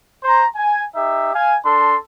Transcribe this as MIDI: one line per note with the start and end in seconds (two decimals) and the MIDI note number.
0.24 0.44 72
0.24 0.44 82
0.24 0.44 84
0.55 0.82 80
0.95 1.32 63
0.95 1.32 67
0.95 1.32 76
1.35 1.56 77
1.35 1.56 80
1.65 1.96 62
1.65 1.96 69
1.65 1.96 84